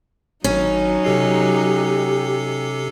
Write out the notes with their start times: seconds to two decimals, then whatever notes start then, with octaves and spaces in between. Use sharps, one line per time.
0.44 G#1 F#3 C#4 D#4
1.04 C3 G4 A4 C7